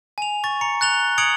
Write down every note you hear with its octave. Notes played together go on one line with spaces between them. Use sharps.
G#5 F7
C#6 A6
A#5 C#7
F#6 A6 F7 G7
D#6 G#6 C#7 D7 F7 F#7